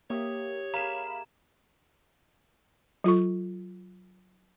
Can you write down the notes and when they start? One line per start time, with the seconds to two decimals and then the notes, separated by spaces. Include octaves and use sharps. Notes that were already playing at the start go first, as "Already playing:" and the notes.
0.10 A#3 G4 C#5 E5 D#6
0.74 A#3 G#4 F5 A#5 B5 E7
3.04 F#3 F4 A4 C#6